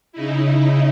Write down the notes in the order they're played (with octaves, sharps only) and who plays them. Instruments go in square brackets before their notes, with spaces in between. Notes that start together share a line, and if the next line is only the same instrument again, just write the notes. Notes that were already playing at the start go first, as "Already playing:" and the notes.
[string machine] C#3 D#4 E4